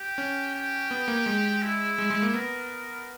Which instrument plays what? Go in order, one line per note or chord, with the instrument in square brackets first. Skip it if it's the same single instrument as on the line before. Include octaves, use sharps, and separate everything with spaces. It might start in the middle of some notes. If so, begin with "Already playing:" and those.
Already playing: [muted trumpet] G4
[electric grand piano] C#4
[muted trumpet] G4
[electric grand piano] B3
A#3
G#3
[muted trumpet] E4
[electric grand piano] G#3
G#3
A#3
[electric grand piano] B3 [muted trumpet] A#4